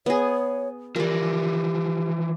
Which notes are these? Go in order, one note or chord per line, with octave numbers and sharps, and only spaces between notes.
B3 G#4 C#5
E3 F3 G4 A#4 D5